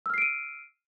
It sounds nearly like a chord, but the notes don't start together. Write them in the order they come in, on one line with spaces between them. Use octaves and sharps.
E6 F6 C7 D7 D#7